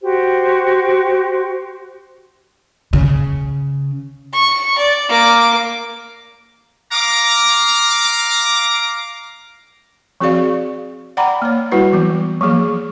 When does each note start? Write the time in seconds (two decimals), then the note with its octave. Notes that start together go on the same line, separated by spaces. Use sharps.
0.02 F#4 G4 C5
2.93 C#3
4.33 C#6
4.78 D5
5.09 A#3 D6
6.92 F5 A#5 D6
10.21 F3 C4 F#4 G#4 D5 F5
11.17 D5 F#5 G5 A#5 B5 D6
11.42 A#3 C#5
11.71 G3 E4 F#4 B4 F#5
11.93 E3 F#3 B3
12.41 F3 F#3 A#3 G#4